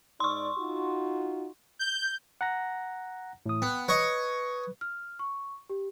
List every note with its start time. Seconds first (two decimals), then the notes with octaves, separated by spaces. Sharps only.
0.20 G#2 D#4 D5 C6 C#6
0.57 D#4 F4 F#4
1.79 G6
2.41 F#5 A#5 A#6
3.46 A2 E3 D#6
3.62 B3 G5 F#6
3.88 B4 C#5 D#5 C#6
4.81 F6
5.19 C#6
5.70 G4